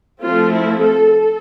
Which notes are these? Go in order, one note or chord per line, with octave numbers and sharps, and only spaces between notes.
F3 A3 C4 F4
E4
A4
A4